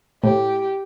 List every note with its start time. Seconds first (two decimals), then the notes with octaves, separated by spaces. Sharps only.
0.24 A2 G4